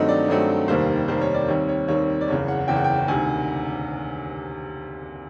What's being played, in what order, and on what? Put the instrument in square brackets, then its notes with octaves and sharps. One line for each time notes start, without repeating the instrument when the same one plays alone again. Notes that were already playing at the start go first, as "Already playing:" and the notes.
Already playing: [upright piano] G2 D#3 F#3 A3 C4 D#5
D5
G2 D#3 F#3 A3 C4
F1 D#2 D#3 G3 A#3 C5
F1 D#2 D#3 G3 A#3 C5
C#5
D5
D#2 D#3 G3 C4 C#5
C#5
D#2 D#3 G3 C4 C#5
D5
F#1 E2 C#3 C#5
F#5
F#1 E2 C#3 G5
F#5
G5
D2 C3 D#3 G#5